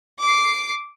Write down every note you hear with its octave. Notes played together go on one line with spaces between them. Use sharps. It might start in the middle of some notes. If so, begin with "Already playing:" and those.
D6 C7